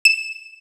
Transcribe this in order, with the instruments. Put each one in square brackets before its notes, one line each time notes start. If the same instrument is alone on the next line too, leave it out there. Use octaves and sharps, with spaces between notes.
[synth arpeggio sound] E7